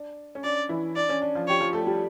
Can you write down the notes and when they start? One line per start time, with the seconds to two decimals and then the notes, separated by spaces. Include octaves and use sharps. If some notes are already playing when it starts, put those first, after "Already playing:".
Already playing: D4
0.35 C#4
0.44 D4 D5
0.69 E3 E4
0.96 D4 D5
1.09 C#4
1.22 D4
1.35 F3 F4
1.48 G4 C#5
1.60 F3 F4
1.73 A3 A4
1.87 G3 G4